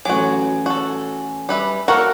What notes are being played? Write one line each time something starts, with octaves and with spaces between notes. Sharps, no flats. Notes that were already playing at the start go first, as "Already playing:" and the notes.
A1 F#3 F#4 G#5 D6
F#4 A4
G3 B4 E5
A#3 F#4 A4 A#4 F5 F#5